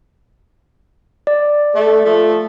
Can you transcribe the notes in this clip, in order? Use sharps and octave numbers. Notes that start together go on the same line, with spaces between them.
D5
A3
F3 A3